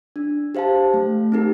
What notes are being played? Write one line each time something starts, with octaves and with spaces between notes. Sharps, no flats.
D4
G4 C5 F5 A5
A3
C4 D#4 G4 A#4